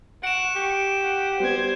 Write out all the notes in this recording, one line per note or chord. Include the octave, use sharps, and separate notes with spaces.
F#5 C#6 D7 E7
G4
F#5
G3 B3 C5 G#6